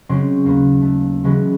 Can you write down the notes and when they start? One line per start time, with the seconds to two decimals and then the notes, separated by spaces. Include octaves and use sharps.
0.09 C#3 F#3 G#3 C4 C#4
0.44 D#2 A#3 B3
0.81 A3
1.24 C#3 E3 F#3 G#3 B3 C#4